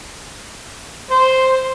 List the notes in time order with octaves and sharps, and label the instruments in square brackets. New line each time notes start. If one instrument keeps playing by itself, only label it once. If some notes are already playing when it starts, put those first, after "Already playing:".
[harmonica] C5